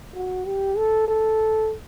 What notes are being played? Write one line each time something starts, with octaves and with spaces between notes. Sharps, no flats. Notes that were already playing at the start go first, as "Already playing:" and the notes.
F#4
G4
A4
A4